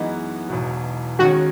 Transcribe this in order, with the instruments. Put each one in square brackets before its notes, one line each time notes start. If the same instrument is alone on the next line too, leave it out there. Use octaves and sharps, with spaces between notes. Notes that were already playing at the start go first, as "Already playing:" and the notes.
Already playing: [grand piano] F#2 E3 G#3 B3 [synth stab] D#4
[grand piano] E1 E2 B2 F#3
[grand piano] D#2 D#3 G#3 C#4 [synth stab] F#4